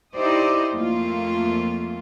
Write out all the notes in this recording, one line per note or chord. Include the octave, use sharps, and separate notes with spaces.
D#4 E4 G4 C5 D5 D#5
F2 A3 A#3 F4